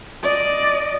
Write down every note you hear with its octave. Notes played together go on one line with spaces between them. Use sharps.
D5 D#5